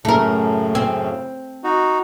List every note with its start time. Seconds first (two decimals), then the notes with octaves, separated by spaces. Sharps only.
0.05 F#2 A2 C#3 A3 A#4
0.75 C4
1.64 D#4 F#4